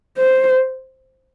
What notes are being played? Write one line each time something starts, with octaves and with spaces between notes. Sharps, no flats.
C5